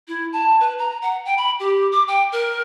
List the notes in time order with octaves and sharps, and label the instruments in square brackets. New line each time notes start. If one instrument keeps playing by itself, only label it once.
[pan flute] E4
A5
B4
A#5
F#5
G5
B5
G4
D6
G5
A#4